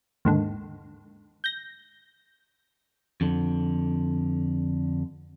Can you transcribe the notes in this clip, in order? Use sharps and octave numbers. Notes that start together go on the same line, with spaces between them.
D#2 G#2 D3
G6 A#6
F2 D3